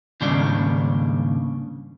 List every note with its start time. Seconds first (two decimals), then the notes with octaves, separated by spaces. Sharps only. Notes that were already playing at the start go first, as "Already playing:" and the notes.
0.21 D#2 G#2 C#3 G3 D4